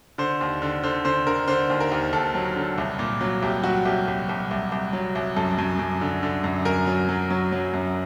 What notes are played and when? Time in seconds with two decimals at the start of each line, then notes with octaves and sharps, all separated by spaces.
0.18 D3 C5
0.41 D#2
0.62 D3
0.83 D3 C5
1.05 D3 C5
1.27 D3 A#4
1.48 D3 C5
1.70 D#2
1.80 A#4
1.92 D#2
2.13 D#2 A4
2.35 F#3
2.56 D3
2.78 C2
2.99 A#2
3.21 F#3
3.42 C2 G4
3.63 F#3 F#4
3.85 C2 G4
4.08 C2
4.29 C2
4.51 C2
4.72 C2
4.93 F#3
5.15 C2
5.36 F#2 A4
5.58 F#2
5.79 F#2
6.01 D3
6.23 D3
6.44 F#2
6.65 F#2 A#4
6.87 F#3
7.09 F#3
7.30 F#3
7.52 F#3
7.74 F#2